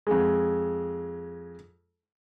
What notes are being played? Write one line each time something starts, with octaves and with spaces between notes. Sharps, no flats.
F2 G#3